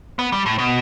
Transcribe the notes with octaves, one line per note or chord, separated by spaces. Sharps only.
B3
G3
A2
B2